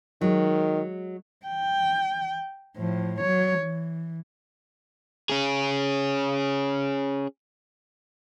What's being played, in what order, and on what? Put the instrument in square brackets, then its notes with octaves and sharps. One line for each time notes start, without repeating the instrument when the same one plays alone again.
[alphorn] D#3 [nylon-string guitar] F#3 G#3
[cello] G5
A2 F3
F#3 C#5
E3
[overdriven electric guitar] C#4 G#4